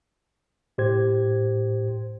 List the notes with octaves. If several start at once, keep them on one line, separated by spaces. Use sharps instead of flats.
A2 G4 C5 G#6